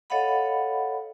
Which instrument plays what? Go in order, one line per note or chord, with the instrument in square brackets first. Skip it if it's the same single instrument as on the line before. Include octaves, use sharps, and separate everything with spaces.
[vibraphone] A4 C#5 D#5 F5 F#5 B5